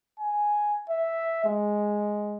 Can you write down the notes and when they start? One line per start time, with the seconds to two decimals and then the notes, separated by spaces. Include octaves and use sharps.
0.20 G#5
0.89 E5
1.45 G#3